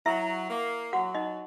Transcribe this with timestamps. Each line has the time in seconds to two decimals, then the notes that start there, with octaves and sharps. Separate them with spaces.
0.06 F#3 E4 E5
0.49 A#3
0.93 F#3 F#4 F#5
1.15 D#4 D#5